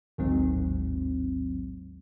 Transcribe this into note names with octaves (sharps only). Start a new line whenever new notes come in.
A1 D#2 G#2 D#3 F#3 C4